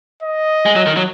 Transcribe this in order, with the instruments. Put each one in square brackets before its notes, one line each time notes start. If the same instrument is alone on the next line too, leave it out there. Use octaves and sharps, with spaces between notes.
[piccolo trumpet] D#5
[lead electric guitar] G#3
F#3
D#3
F#3